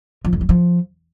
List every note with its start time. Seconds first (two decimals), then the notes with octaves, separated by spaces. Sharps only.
0.25 F3
0.33 F2
0.41 F#3
0.49 F3